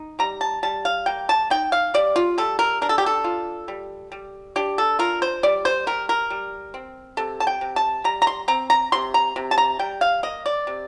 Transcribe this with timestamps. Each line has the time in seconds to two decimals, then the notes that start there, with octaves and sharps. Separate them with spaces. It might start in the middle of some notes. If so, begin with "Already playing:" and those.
Already playing: D#4
0.19 G3 A#5
0.41 A5
0.63 G3 A5
0.85 F5
1.06 A#3 G5
1.29 A5
1.50 D#4 G5
1.72 F5
1.94 G3 D5
2.16 F4
2.38 G3 A4
2.59 A#4
2.82 D4 A#4
2.89 A4
2.98 G4
3.06 A4
3.24 F4
3.68 G3
4.12 G3
4.56 D4 G4
4.78 A4
4.99 F4 A#4
5.22 C5
5.43 G3 D5
5.65 C5
5.87 G3 A#4
6.09 A#4
6.30 G3
6.74 C4
7.17 C3 A4
7.40 A5
7.47 G5
7.61 C3
7.76 A5
8.04 G3 A#5
8.22 A#5
8.27 C6
8.48 C4 A#5
8.70 A#5
8.92 C3 C6
9.14 A#5
9.36 C3
9.51 A5
9.58 A#5
9.79 G3 G5
10.01 F5
10.23 A#3 D#5
10.46 D5
10.67 C3